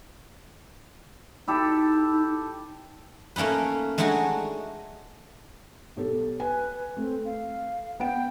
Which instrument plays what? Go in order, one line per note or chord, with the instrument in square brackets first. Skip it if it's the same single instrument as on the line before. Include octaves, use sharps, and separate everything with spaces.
[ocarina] D#4 [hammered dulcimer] E4 G4 A4
[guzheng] A3 A#3 C#4 D#4 B4
G#3 A3 D4 D#4 F#4 G#5
[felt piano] B1 G4 A4
[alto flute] B4 [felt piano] G#5
[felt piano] A3 [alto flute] C4
[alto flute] F5
[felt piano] B3 F#5 D7 [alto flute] G5